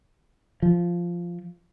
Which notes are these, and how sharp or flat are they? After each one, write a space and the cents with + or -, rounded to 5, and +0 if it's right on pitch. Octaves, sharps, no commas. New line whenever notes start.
F3 -5